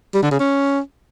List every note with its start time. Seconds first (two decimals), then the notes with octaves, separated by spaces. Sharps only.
0.14 G3
0.23 D3
0.31 C#3
0.40 C#4